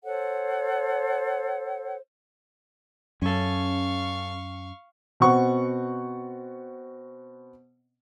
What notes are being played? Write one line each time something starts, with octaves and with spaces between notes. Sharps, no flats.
A4 C5 C#5 F#5
F#2 C#4 A4 F5 C#6
B2 C4 F#5 C#6